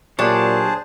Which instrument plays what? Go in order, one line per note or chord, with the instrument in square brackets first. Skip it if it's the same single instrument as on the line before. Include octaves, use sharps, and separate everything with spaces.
[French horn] A#2 [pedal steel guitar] F#3 G4 C#5 [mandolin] D4 [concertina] G#4 C5 A5